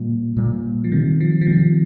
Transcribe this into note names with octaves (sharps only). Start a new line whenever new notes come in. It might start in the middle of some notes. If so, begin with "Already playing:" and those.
Already playing: A#2 G3 A#3
A#2 G3 A#3
F3
C3 D#3 G3 C4
F3
F3
C3 D#3 G3 C4